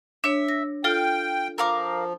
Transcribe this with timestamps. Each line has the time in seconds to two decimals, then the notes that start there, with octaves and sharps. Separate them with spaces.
0.24 D4 C#5 E5
0.49 A#6
0.84 F4 A4 F5 G5
1.58 F3 A#4 F5 D6